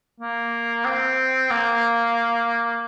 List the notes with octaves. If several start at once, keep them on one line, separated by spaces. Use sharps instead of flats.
A#3
C4
A#3